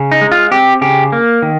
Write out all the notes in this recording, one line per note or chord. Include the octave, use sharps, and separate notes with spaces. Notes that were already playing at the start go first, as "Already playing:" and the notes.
Already playing: C#3
D#4
G#3
F4
C4 G4
C#3 G4
A#3
D#3